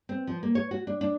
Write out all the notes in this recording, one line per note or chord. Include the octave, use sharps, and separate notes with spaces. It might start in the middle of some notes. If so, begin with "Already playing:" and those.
C4
F3
A#3
C#5
F#4
D4
D4